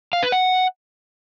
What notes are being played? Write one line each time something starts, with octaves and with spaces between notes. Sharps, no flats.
F5
B4
F#5